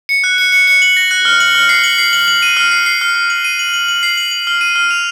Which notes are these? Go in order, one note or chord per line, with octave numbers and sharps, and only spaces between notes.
C#7
F#6
C#7
C#7
C#7
F#7
A#6
F#6
F6
F#7
F6
C7
F#7
C7
F#7
F#7
D#7
F6
C7
C7
F6
F6
F#7
D#7
F#7
F#7
F#7
C7
F#7
F#7
F6
D#7
F6
F7